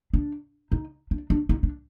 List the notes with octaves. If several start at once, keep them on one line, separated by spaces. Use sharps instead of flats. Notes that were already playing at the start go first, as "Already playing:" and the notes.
D4
D#4
D4
D4
D#4
D4